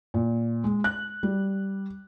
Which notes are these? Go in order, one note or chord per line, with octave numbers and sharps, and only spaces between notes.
A#2
G#3
F#6
G3